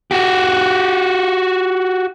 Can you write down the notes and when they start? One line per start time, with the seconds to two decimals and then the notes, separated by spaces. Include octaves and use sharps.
0.11 F#4 G4